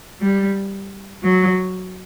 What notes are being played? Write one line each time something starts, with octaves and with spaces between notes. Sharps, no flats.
G3
F#3